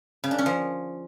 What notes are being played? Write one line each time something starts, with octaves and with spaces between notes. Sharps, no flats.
C#3
D4
C#4
F3